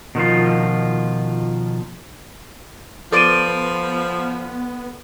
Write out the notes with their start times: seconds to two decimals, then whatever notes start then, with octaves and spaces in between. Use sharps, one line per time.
0.15 B2 D#3 F3 F4
3.12 F3 B3 A4 D5 C6 D6 D#7